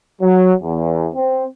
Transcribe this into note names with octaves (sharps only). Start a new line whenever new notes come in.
F#3
E2
C4